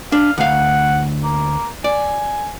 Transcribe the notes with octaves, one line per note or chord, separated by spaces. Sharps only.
D4 F5
D2 F5 F#5
A#3
D5 G#5